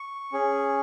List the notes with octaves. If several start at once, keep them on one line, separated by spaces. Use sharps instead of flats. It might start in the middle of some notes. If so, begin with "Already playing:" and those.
Already playing: C#6
C#4 G#4